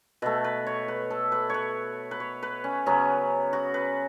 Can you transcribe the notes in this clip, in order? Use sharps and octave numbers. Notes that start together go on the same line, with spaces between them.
B2 A3 B4
B4
C#5
B4
A4
B4
B4 C#5
B4
C#5
B4
C#4
C#3 F#3 B3 C#4
F#4
B4